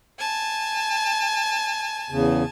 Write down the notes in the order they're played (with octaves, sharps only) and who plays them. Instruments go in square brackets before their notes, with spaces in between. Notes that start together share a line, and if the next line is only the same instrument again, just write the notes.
[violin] G#5 A5
[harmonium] E2 C#3